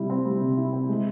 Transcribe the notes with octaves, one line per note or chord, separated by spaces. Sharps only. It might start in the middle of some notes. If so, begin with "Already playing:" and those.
Already playing: C3 G3 E4
C4
G3
C3
E4
C4
G#3